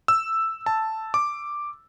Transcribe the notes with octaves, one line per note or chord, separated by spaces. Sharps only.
E6
A5
D6